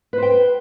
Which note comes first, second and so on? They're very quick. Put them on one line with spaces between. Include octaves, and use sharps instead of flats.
B4 C5 G5